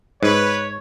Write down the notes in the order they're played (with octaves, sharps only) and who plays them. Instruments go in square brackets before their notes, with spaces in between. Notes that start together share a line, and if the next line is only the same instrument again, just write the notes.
[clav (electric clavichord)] G#2 [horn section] B4 [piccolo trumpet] C#5